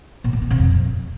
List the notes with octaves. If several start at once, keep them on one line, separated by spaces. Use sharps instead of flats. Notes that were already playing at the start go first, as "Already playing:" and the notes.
A#2
A2
A#2
C3
F2